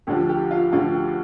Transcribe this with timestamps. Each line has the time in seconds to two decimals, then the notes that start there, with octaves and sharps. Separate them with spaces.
0.07 D2 D3 F3 G4
0.29 G4
0.51 F4
0.73 D2 D3 F3 F4
0.94 G4